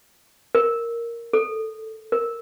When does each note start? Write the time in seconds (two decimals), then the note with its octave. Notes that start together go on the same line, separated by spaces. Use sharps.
0.55 A#4
1.33 A4
2.12 A#4